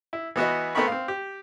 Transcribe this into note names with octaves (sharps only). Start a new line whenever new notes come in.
E4
E3 B3 F#4 D#5
A3 B3 C4 A#4 B5 C#6
C4 F5
G4